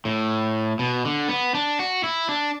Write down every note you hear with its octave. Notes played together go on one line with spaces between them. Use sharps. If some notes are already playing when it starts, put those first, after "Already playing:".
A2
B2
D3
B3
D4
F#4
E4
D4